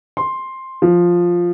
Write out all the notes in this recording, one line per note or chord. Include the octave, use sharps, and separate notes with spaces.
C6
F3